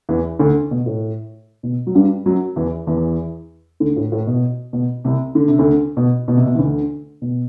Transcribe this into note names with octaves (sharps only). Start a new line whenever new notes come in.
E2 E3
D2 D3
B2
A2
B2
F#3
G2 G3
F#2 F#3
E2 E3
E2 E3
D2 D3
A2
A2
B2
B2
C2 C3
D3
C3
D2 D3
B2
B2
C3
B2
E3
D2 D3
B2